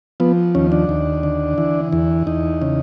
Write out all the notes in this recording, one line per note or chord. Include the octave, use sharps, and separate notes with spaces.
F3 B3
D#2 C#4
D4
D#2
D3
E3
E2
E2 D#4
C#3